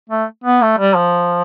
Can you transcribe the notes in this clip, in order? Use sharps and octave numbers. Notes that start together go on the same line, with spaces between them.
A3
B3
A3
G3
F3